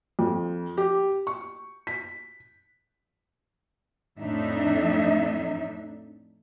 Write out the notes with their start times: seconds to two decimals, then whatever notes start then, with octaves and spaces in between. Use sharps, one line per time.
0.19 F2
0.78 G4
1.27 C#6
1.87 B6
4.19 F2 A2 D4 D#4 E5